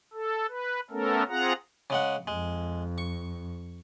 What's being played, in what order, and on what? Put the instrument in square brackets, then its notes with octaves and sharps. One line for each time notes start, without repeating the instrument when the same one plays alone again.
[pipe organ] A4
B4
A3 B3 C#4 A4 A#4
C4 F4 G#4 F#5 A#5
[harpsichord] C#3 G#3 F#5
[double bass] F2 [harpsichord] G#3
[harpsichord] C#6